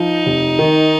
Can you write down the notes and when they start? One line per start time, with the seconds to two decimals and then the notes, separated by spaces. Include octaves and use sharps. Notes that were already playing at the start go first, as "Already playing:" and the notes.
Already playing: F3 D#4
0.26 F1
0.59 D#3